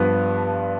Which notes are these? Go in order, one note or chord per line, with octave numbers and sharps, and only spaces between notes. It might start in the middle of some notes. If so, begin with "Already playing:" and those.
Already playing: G2 F3 B3